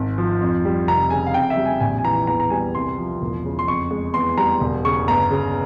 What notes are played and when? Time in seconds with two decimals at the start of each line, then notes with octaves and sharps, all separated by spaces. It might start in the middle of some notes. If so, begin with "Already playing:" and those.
Already playing: G#1
0.18 F3
0.41 F2
0.65 G3
0.88 F1 A#5
1.10 C#3 G#5
1.27 F5
1.34 F2 G5
1.50 E5
1.57 G3
1.66 G#5
1.80 A#1 G#5
1.98 G#5
2.04 E3 A#5
2.27 E2 A#5
2.40 A#5
2.50 G3 G#5
2.75 C2 C6
2.98 F3
3.22 E1
3.45 C#3
3.59 C6
3.68 F2 C#6
3.91 G#3
4.14 E2 C6
4.38 G3 A#5
4.61 E1
4.85 C#3 C#6
5.08 G1 A#5
5.31 C#3